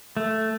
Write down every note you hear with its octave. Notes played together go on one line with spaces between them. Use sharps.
A3